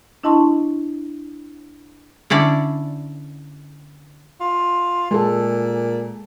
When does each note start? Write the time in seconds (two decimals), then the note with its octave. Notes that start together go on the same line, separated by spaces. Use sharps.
0.23 D4 E4 D#5 A5 C6 C#6
2.30 D3 C#4 E4 D5
4.41 F4
5.11 A#2 G#3 A4